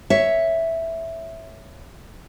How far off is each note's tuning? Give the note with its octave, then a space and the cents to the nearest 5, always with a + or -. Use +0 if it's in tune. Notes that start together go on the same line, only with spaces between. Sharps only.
C#5 +0 E5 +0